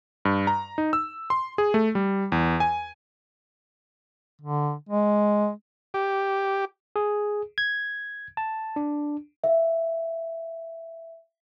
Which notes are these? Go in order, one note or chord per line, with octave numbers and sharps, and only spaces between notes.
G2
A#5
D#4
E6
C6
G#4
A3
G3
E2
G#5
D3
G#3
G4
G#4
G#6
A5
D4
E5 F5